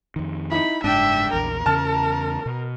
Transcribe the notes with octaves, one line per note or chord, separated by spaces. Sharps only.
F2 D#3
D#4 E4 B5
F#1 G#2 D4 E5 G5
A#1 E2 A#4
E2 C#3 C#4 A5 F6
B2